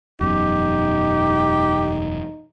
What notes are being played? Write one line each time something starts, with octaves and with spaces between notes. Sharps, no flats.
E1 F#2 B2 D#4 G4